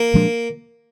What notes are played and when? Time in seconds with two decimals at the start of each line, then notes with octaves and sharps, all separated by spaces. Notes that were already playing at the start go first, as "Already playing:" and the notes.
Already playing: A#3
0.14 A#2 F3 G#3 D4